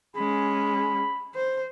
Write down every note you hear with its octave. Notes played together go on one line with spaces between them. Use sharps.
G#3 C#4 B5
C5